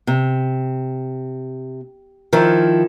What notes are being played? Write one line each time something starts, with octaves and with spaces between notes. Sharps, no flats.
C3
D#3 F3 E4